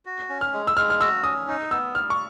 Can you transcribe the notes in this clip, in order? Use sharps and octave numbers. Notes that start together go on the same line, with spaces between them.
F#4
C#4
F6
G#3
E6
G#3 F6
F6
F#4 E6
C#4 D#6
D#4
B3 E6
G3 F6
C#6